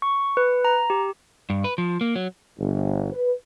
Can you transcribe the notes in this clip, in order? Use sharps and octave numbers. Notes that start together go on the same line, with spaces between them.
C#6
B4
A#5
G4
G2
B4
F3
A#3
F#3
G1
B4